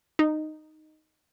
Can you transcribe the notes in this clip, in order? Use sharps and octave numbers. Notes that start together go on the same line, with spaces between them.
D#4